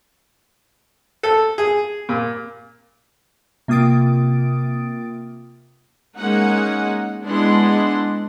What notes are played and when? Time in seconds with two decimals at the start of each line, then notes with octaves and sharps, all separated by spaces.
1.23 A4
1.58 G#4
2.09 A#2
3.68 C3 A#3 F4 D#6 A6 D7
6.17 G#3 A#3 C#4 D#4 F#5
7.24 G#3 B3 D4 E4 F#5 C6